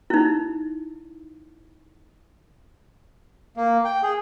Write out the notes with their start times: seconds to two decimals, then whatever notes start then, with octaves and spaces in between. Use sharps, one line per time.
0.10 D#4 E4
3.57 A#3
3.85 G5
4.03 G#4